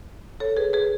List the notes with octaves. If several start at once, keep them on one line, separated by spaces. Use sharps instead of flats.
A4 C#5
G#4 B4
G#4 B4